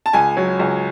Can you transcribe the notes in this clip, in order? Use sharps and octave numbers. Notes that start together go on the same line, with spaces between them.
A5
C#2 G#5
F#3
C#2